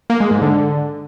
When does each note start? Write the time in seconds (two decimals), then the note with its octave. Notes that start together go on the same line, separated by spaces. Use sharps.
0.10 A#3
0.20 G#3
0.31 G#2
0.42 D3